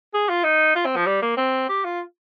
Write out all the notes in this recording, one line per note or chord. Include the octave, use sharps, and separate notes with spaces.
G#4
F4
D#4
F4
C4
F3
G3
A#3
C4
G4
F4